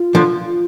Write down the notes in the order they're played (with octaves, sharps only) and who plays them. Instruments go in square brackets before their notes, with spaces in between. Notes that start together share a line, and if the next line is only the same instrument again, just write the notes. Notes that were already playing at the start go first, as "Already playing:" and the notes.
Already playing: [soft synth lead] F4
[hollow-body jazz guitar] D3 F3